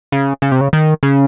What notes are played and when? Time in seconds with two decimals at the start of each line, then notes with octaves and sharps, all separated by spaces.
0.12 C#3
0.42 C#3
0.52 C3
0.61 C#3
0.73 D#3
1.03 C#3